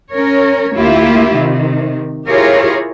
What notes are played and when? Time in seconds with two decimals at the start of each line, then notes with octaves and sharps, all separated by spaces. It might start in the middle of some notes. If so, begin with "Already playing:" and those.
0.12 C#4 A#4 C#5
0.76 D2 A#3 E4 F4 G4 E5
1.34 C3 D#3
2.28 E4 F4 G4 G#4 A#4 C#5